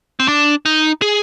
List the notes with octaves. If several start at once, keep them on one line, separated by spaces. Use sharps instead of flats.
C4
D4
D#4
G#4